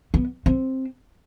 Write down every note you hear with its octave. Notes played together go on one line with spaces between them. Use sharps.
B3
C4